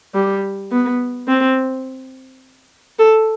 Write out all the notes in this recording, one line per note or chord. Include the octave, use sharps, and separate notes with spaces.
G3
B3
C4
A4